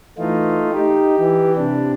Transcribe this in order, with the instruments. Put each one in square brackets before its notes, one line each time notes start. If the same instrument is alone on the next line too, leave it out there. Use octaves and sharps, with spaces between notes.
[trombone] E3 [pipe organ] A3 D#4 F4
[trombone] D#4 [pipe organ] G4
[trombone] E3
[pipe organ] C3 D4